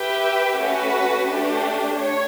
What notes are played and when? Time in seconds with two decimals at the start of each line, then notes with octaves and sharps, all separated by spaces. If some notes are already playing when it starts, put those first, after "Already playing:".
Already playing: G4 B4 E5 G5
0.58 A3 C#4 F#4 B4
1.27 A3 D4 G4
1.97 C#5